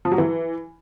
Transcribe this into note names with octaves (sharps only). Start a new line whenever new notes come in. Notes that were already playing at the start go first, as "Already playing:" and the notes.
F3
F#3
E3